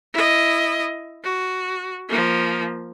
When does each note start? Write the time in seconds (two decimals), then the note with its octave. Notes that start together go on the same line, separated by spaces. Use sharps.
0.13 E4 D#5
1.23 F#4
2.09 F3 A#3